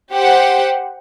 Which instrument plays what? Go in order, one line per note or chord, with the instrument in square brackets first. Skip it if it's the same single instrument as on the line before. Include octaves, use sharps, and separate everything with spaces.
[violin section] G4 C5 F#5